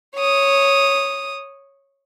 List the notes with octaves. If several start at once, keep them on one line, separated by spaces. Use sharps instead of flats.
C#5 D#6